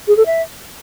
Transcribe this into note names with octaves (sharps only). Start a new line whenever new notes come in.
G#4
A4
E5